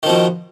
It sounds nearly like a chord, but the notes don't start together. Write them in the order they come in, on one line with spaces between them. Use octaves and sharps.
D#3 F3 B2